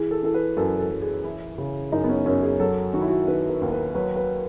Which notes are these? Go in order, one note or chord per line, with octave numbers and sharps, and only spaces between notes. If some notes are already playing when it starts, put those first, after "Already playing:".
Already playing: E3 G#4
A4
E3 A4
B4
F#2 A4
A4
F#2
G#4
E3 E4
C#3
F#2 D#4
B3
C#4
F#2 C#4
G#4
F#3 A4
D#3 F#4
E4
F#4
D#3 B4
B4
D#2
B4
F#3 B4
B4